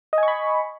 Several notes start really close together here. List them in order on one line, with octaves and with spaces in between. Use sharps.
D#5 G#5 C#6 B5